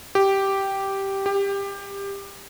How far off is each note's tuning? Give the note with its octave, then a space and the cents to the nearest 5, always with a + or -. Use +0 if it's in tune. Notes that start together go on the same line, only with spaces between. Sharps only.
G4 -5
G4 +20